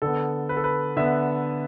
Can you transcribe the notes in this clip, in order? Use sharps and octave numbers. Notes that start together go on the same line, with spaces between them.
D3 B3 A4
B4
A4
B4
D3 B3 E5